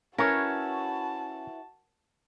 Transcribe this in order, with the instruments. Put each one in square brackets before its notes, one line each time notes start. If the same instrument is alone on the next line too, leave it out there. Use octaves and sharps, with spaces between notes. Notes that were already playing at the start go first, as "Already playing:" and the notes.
[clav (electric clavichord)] C#4 [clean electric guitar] E4 B4 C#5 [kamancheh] F#4 A5 [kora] A#4